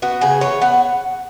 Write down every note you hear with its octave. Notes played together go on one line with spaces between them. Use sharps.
B3 F#4
C#3 G#4
E3 C#5
B3 F#5